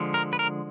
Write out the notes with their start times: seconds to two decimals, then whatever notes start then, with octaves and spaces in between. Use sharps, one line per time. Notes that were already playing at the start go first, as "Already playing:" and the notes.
Already playing: D3 F3 G#3
0.14 A#4
0.33 B4
0.39 A#4